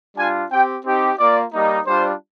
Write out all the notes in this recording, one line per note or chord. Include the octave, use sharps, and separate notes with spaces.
G3 D4 F4 G#5
C4 G4 G5
C4 D#4 G4
A#3 F4 D5
G3 A#3 D#4
G3 D4 F4 C5